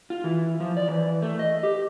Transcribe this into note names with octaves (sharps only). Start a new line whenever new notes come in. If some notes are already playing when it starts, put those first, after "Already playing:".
F4
E3
F3
D5
E3
A3
D#5
G4